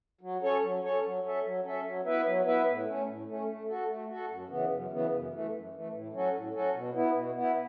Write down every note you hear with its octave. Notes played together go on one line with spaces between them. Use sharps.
F#3
C#4 A4 C#5
F#3
C#4 A4 C#5
F#3
C#4 A4 E5
F#3
C#4 A4 E5
F#3
B3 E4 B4 E5
F#3
B3 E4 B4 E5
A2
A3 C#4
A2
A3 C#4
A3
F#4 A4
A3
F#4 A4
F#2
C#3 E3 B3
F#2
C#3 E3 B3
F#2
E3 A3
F#2
E3 A3
A2
F#3 C#4 F#4 A4
A2
F#3 C#4 F#4 A4
B2
B3 E4
B2
B3
E4